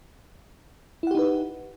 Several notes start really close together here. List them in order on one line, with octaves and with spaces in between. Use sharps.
E4 F#5 G4 D#4 B4